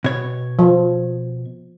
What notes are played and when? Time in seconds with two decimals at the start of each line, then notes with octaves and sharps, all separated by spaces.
0.04 B2 C#5
0.59 F3